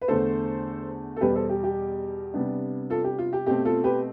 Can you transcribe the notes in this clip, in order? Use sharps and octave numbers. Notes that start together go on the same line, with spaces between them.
B4
E2 D3 A3 A4 C5
A4
E2 B2 G3 G4 B4
A4 C5
G4
G4
C3 G3 B3 D4
F4 A4
G4
F4
G4
B2 A3 C4 G4
F4 A4
G4 B4